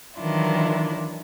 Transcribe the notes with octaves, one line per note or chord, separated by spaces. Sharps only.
D#3 E3 F#3 D4 E4 F4